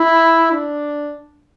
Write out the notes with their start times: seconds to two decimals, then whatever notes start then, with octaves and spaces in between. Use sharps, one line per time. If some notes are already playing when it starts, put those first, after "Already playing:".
Already playing: E4
0.52 D4